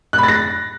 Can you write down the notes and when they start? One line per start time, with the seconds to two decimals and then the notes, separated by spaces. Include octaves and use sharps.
0.13 F#6
0.18 B5
0.23 A6
0.28 A#6